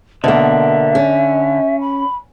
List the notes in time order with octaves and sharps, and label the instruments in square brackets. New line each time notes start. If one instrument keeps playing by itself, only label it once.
[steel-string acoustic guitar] B2 A#3 [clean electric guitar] D3 [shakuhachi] E5
[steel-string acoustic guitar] C#4
[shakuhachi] B5